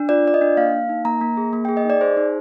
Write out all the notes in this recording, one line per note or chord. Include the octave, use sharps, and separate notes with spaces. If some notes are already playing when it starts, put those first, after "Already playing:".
Already playing: D4
F4 D5
F4 D5
D#5
D4
A#3 F5
A#3
D#4
A#3 A#5
A#3
G#4
A#3
G#4 G5
D#5
D#4
D5
G#4 C5
D#4